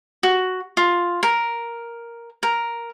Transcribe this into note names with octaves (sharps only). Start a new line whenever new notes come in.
F#4
F4
A#4
A#4